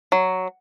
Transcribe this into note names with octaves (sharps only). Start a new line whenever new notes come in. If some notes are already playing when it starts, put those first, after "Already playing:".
F#3